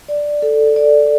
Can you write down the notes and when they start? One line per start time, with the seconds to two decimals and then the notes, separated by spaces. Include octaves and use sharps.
0.08 D5
0.42 A4
0.76 D5